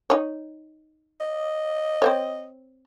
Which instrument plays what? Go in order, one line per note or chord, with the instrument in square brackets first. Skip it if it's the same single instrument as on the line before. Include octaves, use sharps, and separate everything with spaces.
[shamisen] D#4 C#5
[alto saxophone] D#5
[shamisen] C4 C5 C#5